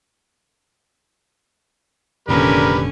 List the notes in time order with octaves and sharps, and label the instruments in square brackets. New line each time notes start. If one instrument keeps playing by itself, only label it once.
[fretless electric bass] F1 A#2 D#3 [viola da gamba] D3 C#4 [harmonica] G3 B4 [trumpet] A#4